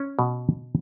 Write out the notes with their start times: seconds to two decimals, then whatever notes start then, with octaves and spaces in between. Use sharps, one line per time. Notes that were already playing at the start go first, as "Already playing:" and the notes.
Already playing: C#4
0.19 B2